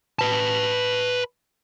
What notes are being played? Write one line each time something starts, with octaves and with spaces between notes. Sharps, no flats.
B4 A5